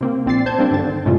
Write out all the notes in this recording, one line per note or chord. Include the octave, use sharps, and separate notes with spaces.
C3 A#3 C4
A#1 C4 D5 A6 C7
C5 A5 G6 G#6
G3 A#3 C4 D4
G2 D3 D#3 A6
F#2 A2 C3 G3 G#3 F4